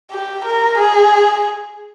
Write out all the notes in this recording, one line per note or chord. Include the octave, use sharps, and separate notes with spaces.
G4
A#4
G#4